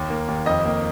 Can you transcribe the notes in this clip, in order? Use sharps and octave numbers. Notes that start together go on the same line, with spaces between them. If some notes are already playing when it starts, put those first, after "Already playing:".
Already playing: D#2
A#3
D#2
F2 D#5
A#3